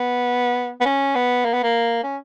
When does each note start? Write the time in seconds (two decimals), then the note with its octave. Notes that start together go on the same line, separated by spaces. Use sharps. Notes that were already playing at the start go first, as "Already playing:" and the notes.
Already playing: B3
0.81 B3
0.85 C#4
1.15 B3
1.45 A#3
1.53 B3
1.63 A#3
2.04 C#4